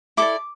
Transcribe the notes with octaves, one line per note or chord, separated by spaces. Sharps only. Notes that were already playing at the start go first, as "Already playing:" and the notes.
E4 A4 D5 D6